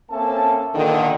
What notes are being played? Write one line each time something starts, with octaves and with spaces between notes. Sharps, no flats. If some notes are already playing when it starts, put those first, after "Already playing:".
A#3 C4 C#4 A4 E5 A5
E2 A#2 D3 D#3